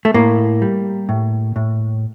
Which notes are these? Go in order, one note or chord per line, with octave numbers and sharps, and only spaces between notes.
A3
A2 A#3
G3
A2
A2